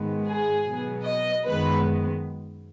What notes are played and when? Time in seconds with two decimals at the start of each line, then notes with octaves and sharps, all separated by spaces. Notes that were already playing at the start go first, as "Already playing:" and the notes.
Already playing: G#2 D#3 G#3 B3
0.26 G#4
0.65 B2 F#3 B3
1.05 D#5
1.45 F#2 D#3 G#3 B3 B4